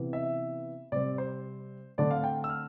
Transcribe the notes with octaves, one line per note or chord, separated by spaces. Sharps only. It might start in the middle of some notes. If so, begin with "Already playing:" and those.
Already playing: C3 E3 B3
E5
C3 G3 C4 D5
C5
D3 A3 C4 D5
F5
G5
E6
F6